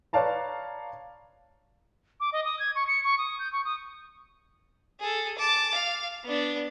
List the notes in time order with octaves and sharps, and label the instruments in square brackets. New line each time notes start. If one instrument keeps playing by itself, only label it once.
[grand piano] B4 C#5 D5 F5 A5 A#5
[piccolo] D6
D#5
D#6
G#6
C#6
C#7
C#6
D#6
G6
C#6
D#6
[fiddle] G#4 A4
A5 D6
F5
B3 D4